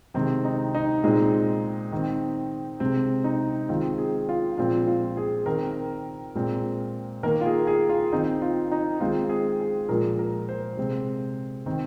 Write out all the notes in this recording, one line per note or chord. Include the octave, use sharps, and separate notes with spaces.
C3 D#3 G#3 C4
D#4
D#4
A#2 G#3 C4 D#4
D#3 C4
C3 G#3 C4
D#4
D#3 G#3 C4 F4
G#4
F4
A#2 F3 G#3 C4 F4
F4
G#4
D#3 C4 A#4
A#2 G#3 C4
D#3 A#3 A#4
F4
G#4
G#4
F4
D#3 C4 D#4
F4
D#4
D#3 G#3 C4 F4
G#4
G#4
A#2 F3 G#3 A#4
A#4
C5
C3 G#3 C4
D#3 C4